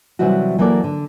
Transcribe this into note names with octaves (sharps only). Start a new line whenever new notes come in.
C3 E3 F#3 G3 E4 F#4
E3 F#3 A#3 A4 D5
D3